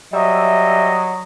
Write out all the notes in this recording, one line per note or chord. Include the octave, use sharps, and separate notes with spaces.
F#3 G3 D#5 E5